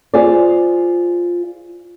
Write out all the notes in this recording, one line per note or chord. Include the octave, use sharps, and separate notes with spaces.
F4 G#4 C5 D5